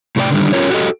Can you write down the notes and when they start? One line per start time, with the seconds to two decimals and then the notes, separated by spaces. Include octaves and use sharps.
0.16 A2 C3 F#4 A#4 D5 G5
0.31 D3 D#3 G3
0.53 C#4 F4 G4 A#4 C#5
0.70 F#4 G4 A4 D#5